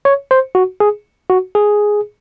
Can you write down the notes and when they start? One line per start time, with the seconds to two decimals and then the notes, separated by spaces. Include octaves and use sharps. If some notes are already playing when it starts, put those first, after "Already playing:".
0.05 C#5
0.31 C5
0.55 F#4
0.80 G#4
1.30 F#4
1.55 G#4